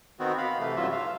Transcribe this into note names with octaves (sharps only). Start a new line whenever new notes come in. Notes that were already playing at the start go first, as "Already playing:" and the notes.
D#3 B3 C4 F#4
B3 F5 B5
C3 E3 A3
G2 C#3 E3 F#3 F4 E5
E5 F5